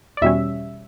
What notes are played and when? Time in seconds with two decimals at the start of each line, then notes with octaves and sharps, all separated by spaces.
0.17 D5
0.21 E2 B2 G3 C#4 E5